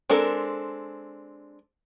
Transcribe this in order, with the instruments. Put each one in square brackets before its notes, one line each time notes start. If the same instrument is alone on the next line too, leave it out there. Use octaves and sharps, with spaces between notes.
[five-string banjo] G#3 C4 D4 A4 A#4